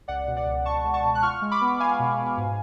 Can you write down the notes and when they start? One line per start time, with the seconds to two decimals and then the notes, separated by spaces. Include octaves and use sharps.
0.08 C#2 D5 F#5
0.27 B2
0.37 D5 F#5
0.46 C#2
0.65 C#2 A5 C#6
0.84 G#3
0.94 A5 C#6
1.04 B2
1.15 F#6
1.22 F4 C#6 F6
1.42 G#3
1.51 B5 D6
1.61 B3
1.80 B3 F5 G#5
1.99 B2
2.18 B2
2.37 G#2